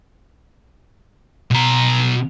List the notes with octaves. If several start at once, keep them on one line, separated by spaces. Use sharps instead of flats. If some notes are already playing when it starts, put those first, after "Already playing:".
B2 A#5